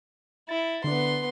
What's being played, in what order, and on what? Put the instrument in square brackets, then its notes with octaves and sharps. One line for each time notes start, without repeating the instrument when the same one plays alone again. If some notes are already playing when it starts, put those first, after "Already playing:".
[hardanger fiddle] E4 [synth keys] A6
[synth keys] D3 D4 [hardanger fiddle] B3 C6